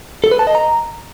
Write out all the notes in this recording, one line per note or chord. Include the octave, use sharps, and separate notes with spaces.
A4
B4
A5
D#5
A#5